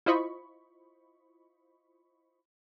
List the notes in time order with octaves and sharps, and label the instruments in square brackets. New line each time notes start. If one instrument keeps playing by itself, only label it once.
[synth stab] E4 F4 C5 D#5 B5 C#6